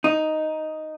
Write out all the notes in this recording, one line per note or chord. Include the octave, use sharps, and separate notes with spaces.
D#4